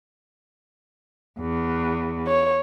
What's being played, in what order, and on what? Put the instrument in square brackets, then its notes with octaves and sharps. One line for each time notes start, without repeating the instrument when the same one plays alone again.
[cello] E2
[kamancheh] C#5